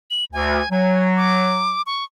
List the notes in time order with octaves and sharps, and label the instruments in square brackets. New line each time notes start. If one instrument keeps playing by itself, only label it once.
[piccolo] F#7
[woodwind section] D2 [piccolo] G#5
[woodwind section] F#3 [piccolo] G#5
[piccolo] D6
C#6